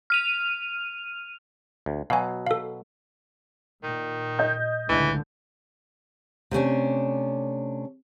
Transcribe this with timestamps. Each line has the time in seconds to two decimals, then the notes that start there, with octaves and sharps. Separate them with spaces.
0.10 F6 D#7 F7
1.86 D2
2.10 B2 F#3 F5 G#5
2.47 A4 F5
3.83 A#2 D#3
4.39 D#5 G6
4.89 C#2 A2 D3 E3
6.51 C3 A3 C#4 D4